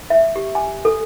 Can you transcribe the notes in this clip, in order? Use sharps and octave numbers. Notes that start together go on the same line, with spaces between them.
E5
G4
G#5
A4